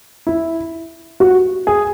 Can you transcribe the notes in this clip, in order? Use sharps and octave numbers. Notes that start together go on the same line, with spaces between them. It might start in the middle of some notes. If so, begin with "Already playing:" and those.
E4
F#4
G#4